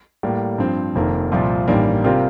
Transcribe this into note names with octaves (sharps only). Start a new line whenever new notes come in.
A2 G3 A#3
G2 F3 C4
F1 F2 D#3 A#3
C2 A#2 F3 C4 F4
A1 G2 D#3 G3 A#3
C3 G3 C4 F4 A#4